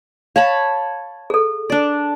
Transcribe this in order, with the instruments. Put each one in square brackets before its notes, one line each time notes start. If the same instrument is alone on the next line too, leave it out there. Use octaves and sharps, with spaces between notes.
[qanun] C#5 A5 B5 [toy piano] F5
[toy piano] G#4 A4
[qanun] D4 D5